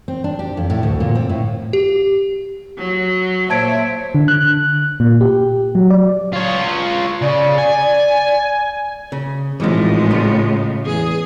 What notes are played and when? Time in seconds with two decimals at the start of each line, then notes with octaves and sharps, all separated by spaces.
0.08 C4
0.24 D4
0.39 G4
0.57 F2
0.70 A2
0.83 D2
1.00 A#2
1.15 C4
1.29 A2
1.73 G4
2.78 F#3
3.50 A#2 C5 C#5 E5 A5 G#6 D7
4.15 D3
4.28 F#6
5.00 A#2
5.21 G4
5.75 F#3
5.90 D5
6.33 F4 C#5
7.22 C#3 D5
7.58 G#5
9.12 C#3
9.60 G#1 A2 E3 F3 G#3
10.11 C#3 C#4 F4
10.86 E2 G#4